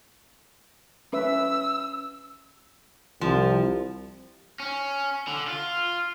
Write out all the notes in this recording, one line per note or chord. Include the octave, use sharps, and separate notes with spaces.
C#4 B4 E5 E6
C2 F3
C#4
D3
F4